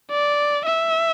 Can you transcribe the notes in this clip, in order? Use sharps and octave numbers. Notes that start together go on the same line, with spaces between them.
D5
E5